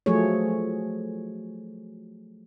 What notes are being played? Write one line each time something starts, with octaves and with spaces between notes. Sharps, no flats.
F3 F#3 A3 G#4 C#5